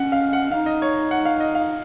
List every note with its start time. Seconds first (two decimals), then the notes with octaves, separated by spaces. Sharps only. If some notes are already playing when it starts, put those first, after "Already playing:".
Already playing: C#4 F#5
0.12 F5
0.33 F#5
0.51 D#4 F5
0.66 D#5
0.82 C#5
1.11 F#5
1.25 F5
1.40 D#5
1.55 F5